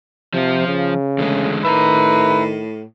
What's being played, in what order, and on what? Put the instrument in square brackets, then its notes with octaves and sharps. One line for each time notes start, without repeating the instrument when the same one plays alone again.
[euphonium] C3 [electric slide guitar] F3 F4
[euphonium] C#3
[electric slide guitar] E2 D3 G#3 [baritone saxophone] A3
[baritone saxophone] A2 [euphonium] D#3 [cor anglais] B4 [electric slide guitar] E5 A5 A#5